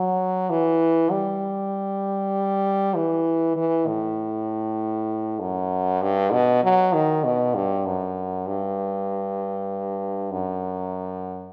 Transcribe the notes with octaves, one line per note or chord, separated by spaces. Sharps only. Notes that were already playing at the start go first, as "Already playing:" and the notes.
Already playing: F#3
E3
G3
E3
E3
A2
F#2
G2
B2
F#3
D#3
B2
G2
F#2
G2
F#2